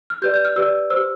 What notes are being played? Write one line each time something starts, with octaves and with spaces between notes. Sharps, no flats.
F6
G4 B4 D5 G6
G6
F6
G4 B4 D5 E6
G4 C5 E6